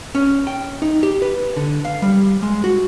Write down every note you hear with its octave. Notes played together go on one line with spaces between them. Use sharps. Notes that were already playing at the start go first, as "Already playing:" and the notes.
C#4
G5
D#4
G4
B4
D3
F5
G3
G#3
F#4